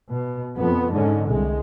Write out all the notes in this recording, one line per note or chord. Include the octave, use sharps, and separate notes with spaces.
B2
F2 B3
G#2 D3 C#4
C2 G#3